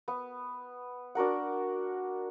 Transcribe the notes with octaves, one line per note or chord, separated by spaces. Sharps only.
B3
D4 F#4 A#4 F#5